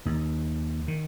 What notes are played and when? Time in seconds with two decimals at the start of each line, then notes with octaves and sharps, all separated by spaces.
0.06 D#2 D#3
0.88 D#3